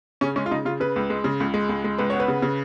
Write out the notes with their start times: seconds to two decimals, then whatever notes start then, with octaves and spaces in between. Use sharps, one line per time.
0.21 C#3 C#4
0.36 G#3 C#4
0.46 F4
0.51 C#3 D#4
0.65 C#3 F4
0.80 C#3 B4
0.96 C#2
1.10 G#3
1.24 C#3
1.40 C#2
1.54 G#3
1.69 C#2
1.84 G#3
1.98 C#2 B4
2.10 B3 C#5
2.20 B4
2.28 C#3
2.42 C#3